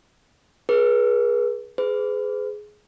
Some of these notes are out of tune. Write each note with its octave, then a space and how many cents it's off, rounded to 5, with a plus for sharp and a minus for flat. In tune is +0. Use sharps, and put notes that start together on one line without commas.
G#4 +0 B4 -40
G#4 +15 B4 +40